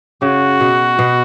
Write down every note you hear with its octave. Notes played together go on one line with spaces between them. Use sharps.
C#3 F#4
B2
B2